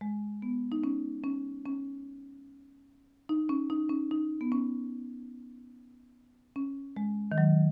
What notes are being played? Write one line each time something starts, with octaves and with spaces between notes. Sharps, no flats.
G#3
B3
D#4
C#4
C#4
C#4
D#4
C#4
D#4
C#4
D#4
B3
C#4
C#4
G#3
D#3
F#3